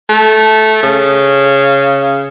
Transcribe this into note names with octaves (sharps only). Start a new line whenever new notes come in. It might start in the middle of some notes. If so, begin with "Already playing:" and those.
A3
C#3